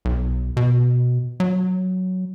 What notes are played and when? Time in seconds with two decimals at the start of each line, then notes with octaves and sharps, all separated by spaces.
0.05 B1
0.57 B2
1.40 F#3